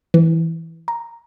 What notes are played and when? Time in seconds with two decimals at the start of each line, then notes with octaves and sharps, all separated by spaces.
0.14 E3
0.88 A#5